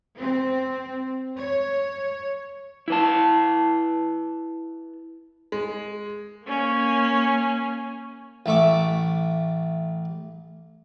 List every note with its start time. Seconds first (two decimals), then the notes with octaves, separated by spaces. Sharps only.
0.18 C4
1.36 C#5
2.88 E4 B4 A5
5.52 G#3
6.45 A#3 C#4
8.46 A1 A3 E5 C#6 D6